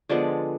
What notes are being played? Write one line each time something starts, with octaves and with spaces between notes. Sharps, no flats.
D3 F3 G#3 B3 D5